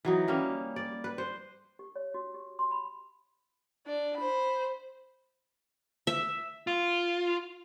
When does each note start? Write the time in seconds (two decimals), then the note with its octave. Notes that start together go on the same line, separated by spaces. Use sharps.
0.05 E3 F#3 D#4
0.28 G3 A#3 C#4
0.76 D5
1.04 B4
1.18 C5
1.79 G4
1.96 C#5
2.14 F#4
2.34 G4
2.59 C6
2.71 B5
3.86 D4 D5
4.17 C5 B5
6.07 E5
6.67 F4